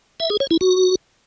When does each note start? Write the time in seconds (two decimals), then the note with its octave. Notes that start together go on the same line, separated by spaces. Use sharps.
0.20 E5
0.30 G#4
0.40 C#5
0.51 E4
0.61 F#4